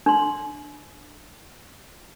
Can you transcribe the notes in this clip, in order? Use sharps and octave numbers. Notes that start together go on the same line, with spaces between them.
D4 C6